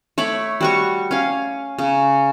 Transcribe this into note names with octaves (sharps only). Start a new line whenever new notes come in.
A3 C#5 B5 D6
G3 F#4 C#6
C#4 F5
C#3